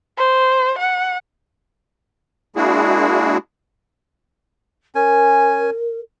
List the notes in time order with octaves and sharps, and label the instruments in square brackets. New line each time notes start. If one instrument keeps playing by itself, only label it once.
[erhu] C5
F#5
[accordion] G#3 A#3 D4 E4 F#4 G#4
[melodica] C#4 G#5 [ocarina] A#4